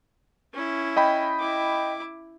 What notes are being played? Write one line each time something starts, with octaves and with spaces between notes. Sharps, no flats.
C#4 E4
D#5 G5 B5
E4 D6